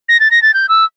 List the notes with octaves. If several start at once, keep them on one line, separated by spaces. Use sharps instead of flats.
A#6
A6
A#6
A6
G6
E6